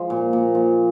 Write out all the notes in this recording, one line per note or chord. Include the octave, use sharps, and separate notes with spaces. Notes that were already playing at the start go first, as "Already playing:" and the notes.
Already playing: F3 G#3
A#2
A#2
F3